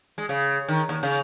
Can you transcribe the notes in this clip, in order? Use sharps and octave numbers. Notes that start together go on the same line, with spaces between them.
G#3
C#3
D#3
D#2
C#3